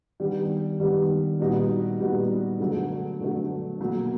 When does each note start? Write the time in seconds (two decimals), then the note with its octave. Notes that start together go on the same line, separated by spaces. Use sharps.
0.20 D#3 G3 B3 D4 G4
0.80 D#3 G3 B3 D4 G4
1.39 A#2 G3 B3 D#4 F#4
2.00 A#2 G3 B3 D#4 F#4
2.60 D3 F#3 A3
3.20 D3 F#3 A3
3.81 B2 F#3 A#3